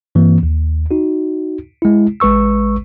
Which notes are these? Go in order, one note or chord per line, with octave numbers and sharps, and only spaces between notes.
G2 E3 A#3 C4
D#2
D#4 F#4
G#3 E4
A1 G#3 B4 C#6 E6